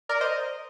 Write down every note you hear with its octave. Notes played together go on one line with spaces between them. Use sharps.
A#4 D5
C5 D#5